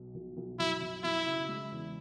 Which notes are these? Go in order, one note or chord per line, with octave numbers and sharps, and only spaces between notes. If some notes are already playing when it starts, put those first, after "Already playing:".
Already playing: B1 B2
B1
B1
F#2 E4
F#2
F#2 E4
C#3
G#3
E2